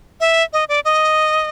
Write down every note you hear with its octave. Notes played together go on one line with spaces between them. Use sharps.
E5
D#5
D5
D#5